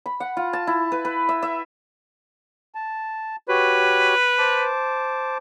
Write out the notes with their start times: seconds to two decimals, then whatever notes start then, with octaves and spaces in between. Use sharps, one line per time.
0.06 B5
0.20 F#5
0.37 F4
0.53 A5
0.67 E4
0.92 B4
1.05 B4
1.29 E5
1.42 E5
2.75 A5
3.49 F#4 G4 B4 C#5
4.39 C5 A5 D6